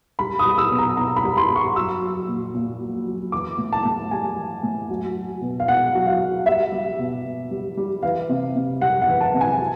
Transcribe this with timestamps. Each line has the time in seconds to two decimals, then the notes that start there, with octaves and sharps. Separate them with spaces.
0.19 G3 B5
0.39 D#6
0.46 G3
0.58 E6
0.71 B2
0.78 A#5
0.97 B2 A#5
1.16 B5
1.24 G3
1.37 C6
1.50 G3
1.56 C#6
1.75 F#3 E6
2.01 F#3
2.28 A#2
2.54 A#2
2.81 F#3
3.06 F#3
3.32 E3 D6
3.58 A2
3.72 A5
3.85 A2
4.11 G3 G#5
4.37 E3
4.63 A2
4.90 F#3
5.16 F#3
5.41 B2
5.60 F5
5.67 B2 F#5
5.94 F#3
6.07 F5
6.20 F#3
6.46 G3 E5
6.72 G3
6.99 B2
7.25 B2
7.51 G3
7.77 G3
8.03 E3 F5
8.29 C3
8.56 C3
8.81 G3 F#5
9.02 F#5
9.08 E3
9.21 A5
9.34 C3
9.41 G#5
9.59 F#3